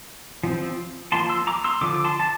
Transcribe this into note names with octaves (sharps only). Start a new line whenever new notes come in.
F3 C4
F3 A#3 A5 C6
C6 E6
A#5 D6
C6 E6
D3 F3 D6
D6
A5 C6
A5